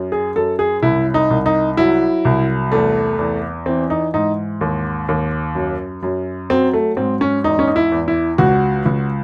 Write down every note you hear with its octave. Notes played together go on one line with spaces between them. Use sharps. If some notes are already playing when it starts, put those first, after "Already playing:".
Already playing: F#2
G#4
F#2 A4
G#4
C2 E4
D#4
C2
D#4
F#3 E4
C2
E2 A3
E2
E3 C4
D#4
G#2 D#4
D#2
D#2
F#2
F#2
F#3 C4
A3
G#2 C4
C#4
E2 D#4
C#4
D#4
E4
E2
E4
C#2 F#4
C#2